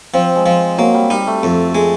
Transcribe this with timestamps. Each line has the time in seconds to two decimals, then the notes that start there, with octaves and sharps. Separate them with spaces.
0.14 F3 C4
0.36 G#3
0.46 F3
0.78 F#3 A#3
0.94 G3
1.10 G3 D#4
1.27 A3
1.43 F2
1.75 G#3